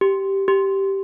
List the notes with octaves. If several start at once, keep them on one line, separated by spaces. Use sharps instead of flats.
G4
G4